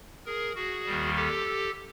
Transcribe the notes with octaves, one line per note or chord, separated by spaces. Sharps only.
G#4 A#4
F#4 G#4
D#2 D#3 G3
G4 A4